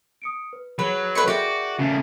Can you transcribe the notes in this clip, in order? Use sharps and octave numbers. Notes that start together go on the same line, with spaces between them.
D#6 C#7 D7
B4
F#3 G#4 B4
A4 B4 D#5 C6 C#6
F#4 G#4 A#4 D5 E5 G5
C#3 A3